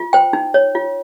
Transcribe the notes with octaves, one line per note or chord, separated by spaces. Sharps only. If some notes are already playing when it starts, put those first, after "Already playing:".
Already playing: F4
C5 G5
D#4
C#5
F4